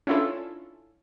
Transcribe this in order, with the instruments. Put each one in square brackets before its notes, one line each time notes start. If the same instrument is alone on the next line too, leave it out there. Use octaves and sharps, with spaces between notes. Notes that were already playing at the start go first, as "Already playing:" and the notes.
[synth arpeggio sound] C#4 D4 E4 F4 A4